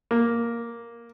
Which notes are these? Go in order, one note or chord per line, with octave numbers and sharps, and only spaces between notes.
A#3